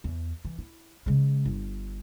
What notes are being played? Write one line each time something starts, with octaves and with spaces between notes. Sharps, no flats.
E2
E3
E4
C#3 G#3
G1